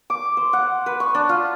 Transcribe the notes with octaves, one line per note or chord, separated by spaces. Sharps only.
D6
C5
F#5
B4
C#6
D4
F4